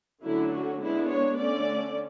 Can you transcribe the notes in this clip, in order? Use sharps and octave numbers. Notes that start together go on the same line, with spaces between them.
D3 F#3 A3 C#4 E4
F#4
G#3 B3 D4 E4
C#5
D3 A3 C#4 D5